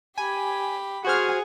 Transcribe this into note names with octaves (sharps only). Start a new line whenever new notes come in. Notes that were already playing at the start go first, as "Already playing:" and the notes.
G4 G#5 B5
F#4 G#4 C5 F#5 G#5 F6